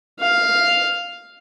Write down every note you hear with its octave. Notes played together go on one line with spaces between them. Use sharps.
F5